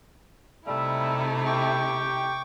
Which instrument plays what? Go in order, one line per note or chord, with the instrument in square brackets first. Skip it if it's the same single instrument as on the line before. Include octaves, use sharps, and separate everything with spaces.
[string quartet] C3 D#4 E4 [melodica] G3 [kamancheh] A3 [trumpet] E5
[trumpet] G4 [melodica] G5 C#6 D6